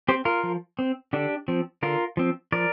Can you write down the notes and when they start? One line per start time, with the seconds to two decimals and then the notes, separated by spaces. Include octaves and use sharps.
0.08 C4 G4 C5
0.25 F4 A#4
0.43 F3
0.79 C4
1.13 D3 D4 G4
1.48 F3 C4
1.83 D3 F4 A#4
2.17 F3 C4
2.52 F3 A#4 D5